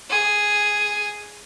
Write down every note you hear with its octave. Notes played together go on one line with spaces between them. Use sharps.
G#4